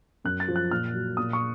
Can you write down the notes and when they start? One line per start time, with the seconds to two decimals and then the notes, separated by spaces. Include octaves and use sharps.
0.24 F#2 F#6
0.40 A6
0.48 F3
0.56 F#6
0.71 A#2 F6
0.94 F#3
1.17 A#2 D#6
1.33 C#6